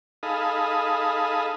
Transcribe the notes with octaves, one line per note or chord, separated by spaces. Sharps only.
D#4 G#4 A4 F5 B5 D#6